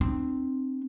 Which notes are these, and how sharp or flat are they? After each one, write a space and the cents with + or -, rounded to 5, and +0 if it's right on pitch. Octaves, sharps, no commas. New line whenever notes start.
C4 +0 D#4 -45